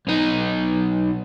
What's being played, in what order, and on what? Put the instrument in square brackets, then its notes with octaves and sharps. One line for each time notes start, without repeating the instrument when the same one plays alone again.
[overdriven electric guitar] B1 D#4